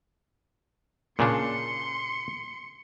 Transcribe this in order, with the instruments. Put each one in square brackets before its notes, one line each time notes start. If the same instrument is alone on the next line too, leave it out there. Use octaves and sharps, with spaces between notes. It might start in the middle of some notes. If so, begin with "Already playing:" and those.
[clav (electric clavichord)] A#2 C#3 D4 [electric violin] C6 C#7